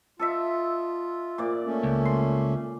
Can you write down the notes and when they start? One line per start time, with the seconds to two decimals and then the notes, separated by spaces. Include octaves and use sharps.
0.19 F4 A4 D#5 E5
1.38 A#2 D5
1.64 A3 C#4
1.83 C#2
2.05 C6